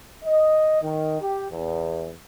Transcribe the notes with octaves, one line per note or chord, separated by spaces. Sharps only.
D#5
D#3
G4
E2